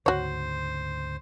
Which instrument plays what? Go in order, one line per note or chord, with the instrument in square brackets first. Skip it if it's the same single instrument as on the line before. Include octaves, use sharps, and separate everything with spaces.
[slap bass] D2 G#2 C#3 [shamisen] F#4 C#5 [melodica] C5